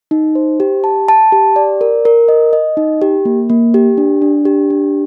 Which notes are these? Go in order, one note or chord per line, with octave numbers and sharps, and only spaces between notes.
D#4
C5
G4
A5
A5
G4
D5
A#4
A#4
D#5
D#5
D#4
G4
A#3
A#3
G4
D4
D4
G4
D4